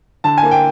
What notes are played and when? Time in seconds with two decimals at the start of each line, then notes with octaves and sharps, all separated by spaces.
0.24 D3 A5
0.38 G#5
0.43 A#3
0.51 G5